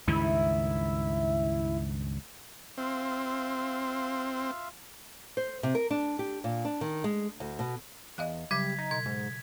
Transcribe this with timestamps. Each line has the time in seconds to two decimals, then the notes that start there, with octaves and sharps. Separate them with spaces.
0.07 C#2 G2 D#3 E4
2.78 C4 F4 E5 F5
5.37 C5
5.63 C3
5.75 A#4
5.91 D4
6.19 G4
6.44 A#2
6.65 D4
6.81 D#3
7.04 G#3
7.40 D2
7.59 B2
8.18 E2 D#5 F5 F#6
8.51 C#3 F#3 G3 G#6 B6
8.78 D#4
8.91 B2 G#6
9.06 G#2